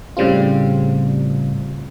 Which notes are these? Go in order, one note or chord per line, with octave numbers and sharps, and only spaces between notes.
A2 C#3 G3 C4 F4